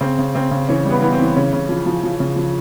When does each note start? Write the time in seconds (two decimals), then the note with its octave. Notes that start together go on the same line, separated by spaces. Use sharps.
0.01 C#3 C4
0.19 C#3
0.35 C#3 C4
0.51 C#3
0.68 E3 C#4
0.85 G3
0.91 B3
1.02 E3 B3
1.13 C4
1.20 E3
1.36 C#3 C#4
1.53 C#3
1.69 F3
1.86 F3
2.03 F3
2.20 C#3
2.36 F3